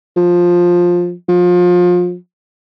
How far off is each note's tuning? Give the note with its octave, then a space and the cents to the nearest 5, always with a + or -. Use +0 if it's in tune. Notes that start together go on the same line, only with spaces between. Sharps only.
F3 +10
F3 +30